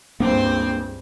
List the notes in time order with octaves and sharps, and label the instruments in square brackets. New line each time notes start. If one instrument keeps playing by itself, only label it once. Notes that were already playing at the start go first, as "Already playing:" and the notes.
[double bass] C#2 G2 [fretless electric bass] A#3 D4 [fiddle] C4 C5